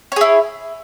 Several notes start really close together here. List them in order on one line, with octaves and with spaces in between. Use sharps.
C#5 G#4 E4